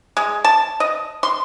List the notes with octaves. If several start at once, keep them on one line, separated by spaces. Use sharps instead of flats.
G#3
A5
D#5
C6